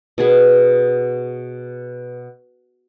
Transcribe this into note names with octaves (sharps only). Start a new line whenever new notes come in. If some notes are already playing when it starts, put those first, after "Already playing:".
B2 G#4 B4